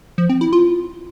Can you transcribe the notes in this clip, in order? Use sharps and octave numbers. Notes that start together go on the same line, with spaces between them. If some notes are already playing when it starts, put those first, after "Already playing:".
F3
C4
E4
F4